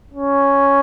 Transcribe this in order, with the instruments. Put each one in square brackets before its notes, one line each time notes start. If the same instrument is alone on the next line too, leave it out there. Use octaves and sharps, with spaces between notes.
[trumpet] C#4